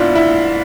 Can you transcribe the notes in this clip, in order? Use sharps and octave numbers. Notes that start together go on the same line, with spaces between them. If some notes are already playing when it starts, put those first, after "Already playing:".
Already playing: G#2 B3 D4 E4 F4
E4